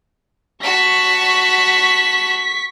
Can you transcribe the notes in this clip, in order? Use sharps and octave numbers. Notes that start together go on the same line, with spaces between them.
F#4 A5 C#6 B6